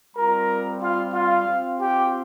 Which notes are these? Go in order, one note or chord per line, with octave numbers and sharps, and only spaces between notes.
G3 C4 F4 A#4 A#5
F4 F5
F4 F5
C4 F4
G4 G5